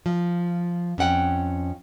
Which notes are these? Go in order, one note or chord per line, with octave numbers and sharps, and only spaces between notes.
F3
F2 C#4 F#5 G5